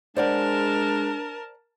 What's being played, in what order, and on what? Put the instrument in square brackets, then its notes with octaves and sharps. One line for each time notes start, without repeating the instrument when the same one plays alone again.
[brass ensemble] G#3 [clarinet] D4 [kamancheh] A#4 A5 [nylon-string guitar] C5 D5 F#5